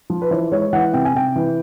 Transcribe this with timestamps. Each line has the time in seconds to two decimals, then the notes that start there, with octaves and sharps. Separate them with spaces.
0.10 F3
0.22 B4
0.31 E3 C5
0.52 G#3 C#5
0.73 E3 F#5
0.94 C3 G5
1.05 G#5
1.15 C3 G5
1.36 E3